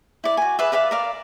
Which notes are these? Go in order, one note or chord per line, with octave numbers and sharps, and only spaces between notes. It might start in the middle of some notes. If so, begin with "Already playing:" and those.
E4 D5
F#4 G#5
G#4 B4 D5 E5
B4 D5 E5 F5
A#4 D5 F5